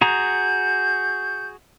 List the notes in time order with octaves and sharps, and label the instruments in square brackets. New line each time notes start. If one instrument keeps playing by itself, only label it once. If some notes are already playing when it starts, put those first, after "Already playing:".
[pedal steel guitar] F#4 G#4 A#5 [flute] G6